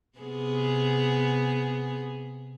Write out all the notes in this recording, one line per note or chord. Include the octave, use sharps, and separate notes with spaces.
C3 B3 G#4